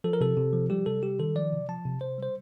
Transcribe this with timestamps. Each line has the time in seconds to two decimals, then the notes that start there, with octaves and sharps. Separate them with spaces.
0.04 F3 A4
0.13 A#4
0.21 C3 A4
0.37 C3
0.53 F3
0.70 G3 G4
0.86 C3 A4
1.03 G3 G4
1.19 D#3 A4
1.35 F3 D5
1.52 C3
1.69 F3 A5
1.86 C3
2.01 C3 C5
2.18 G3 C5